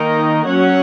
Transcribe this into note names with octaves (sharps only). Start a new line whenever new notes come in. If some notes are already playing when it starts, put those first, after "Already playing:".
Already playing: D#3 A#3 D#4 A#4 D#5
F#3 C#4 C#5 F#5